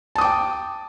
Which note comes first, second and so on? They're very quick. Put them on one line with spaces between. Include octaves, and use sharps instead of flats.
A5 D#6 D6 G5